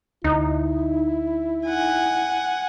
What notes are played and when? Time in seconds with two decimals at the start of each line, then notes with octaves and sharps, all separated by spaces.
0.24 D2 D#4 E4
1.66 F#5 G#5